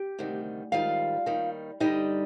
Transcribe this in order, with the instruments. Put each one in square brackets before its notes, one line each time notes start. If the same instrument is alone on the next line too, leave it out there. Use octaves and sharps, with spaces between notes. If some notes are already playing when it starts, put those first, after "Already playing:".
Already playing: [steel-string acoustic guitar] G4
D2 C3 D#3 G3
G#2 D#3 G3 F4 F5
D#2 D#3 G3
G2 D3 G3 D#4 D#5